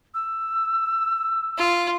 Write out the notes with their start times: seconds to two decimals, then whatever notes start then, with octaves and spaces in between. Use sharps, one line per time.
0.14 E6
1.58 F4